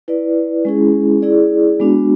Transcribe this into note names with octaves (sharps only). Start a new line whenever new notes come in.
E4 B4 D5
G#3 C#4 E4 G#4
E4 G#4 D5
G#3 B3 D4 F#4